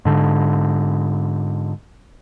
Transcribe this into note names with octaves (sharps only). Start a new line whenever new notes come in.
G#2 D3